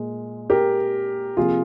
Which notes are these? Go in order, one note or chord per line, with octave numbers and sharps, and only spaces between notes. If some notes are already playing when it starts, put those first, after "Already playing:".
Already playing: A#2 G#3
G4 A#4
C3 F3 A#3 F4 G#4